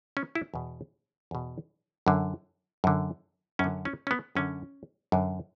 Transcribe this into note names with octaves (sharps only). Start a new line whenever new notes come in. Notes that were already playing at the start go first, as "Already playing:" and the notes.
C#4
E4
E2 B2
E2 B2
F#2 D3
F#2 D3
F#2 D3 C#4
C#4
C#4
B3
F#2 D3 C#4
F#2 D3